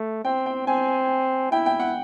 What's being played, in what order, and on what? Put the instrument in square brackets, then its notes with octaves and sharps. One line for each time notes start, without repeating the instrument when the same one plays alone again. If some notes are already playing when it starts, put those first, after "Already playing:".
Already playing: [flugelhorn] A3
[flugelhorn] C4 [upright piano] G5
[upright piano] G5
[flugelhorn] C4 [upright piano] G#5
[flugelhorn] E4 [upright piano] G5
[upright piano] G5
F#5